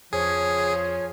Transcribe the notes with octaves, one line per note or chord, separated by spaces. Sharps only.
F2 F3 G#4 C#5